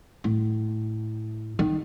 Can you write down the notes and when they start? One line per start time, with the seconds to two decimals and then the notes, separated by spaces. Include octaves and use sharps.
0.24 A2
1.59 D#3